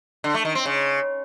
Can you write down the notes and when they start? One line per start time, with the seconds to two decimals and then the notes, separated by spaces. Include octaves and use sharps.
0.24 D3
0.34 A3
0.45 D#3
0.55 C4
0.66 C#3